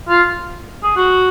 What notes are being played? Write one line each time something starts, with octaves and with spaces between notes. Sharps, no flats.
F4
G#4
F#4